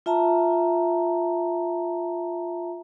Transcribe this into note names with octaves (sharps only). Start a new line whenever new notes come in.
F4 E5 A5 A#5